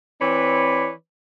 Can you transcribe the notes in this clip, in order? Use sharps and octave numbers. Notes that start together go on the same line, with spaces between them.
E3 C4 B4 C#5 D5